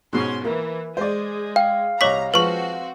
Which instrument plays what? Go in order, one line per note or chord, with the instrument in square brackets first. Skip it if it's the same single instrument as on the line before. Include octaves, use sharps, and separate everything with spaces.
[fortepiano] G#2 B2 [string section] C#4 C6
[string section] E3 [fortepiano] A#3
[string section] G#3 [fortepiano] C5 D5
[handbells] F5 [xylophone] G5
[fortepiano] C2 D#5 D6 [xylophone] C#5 C#6 B6 [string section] A#5
[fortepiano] F3 G#3 [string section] C4 F#4 [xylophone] B4 C#6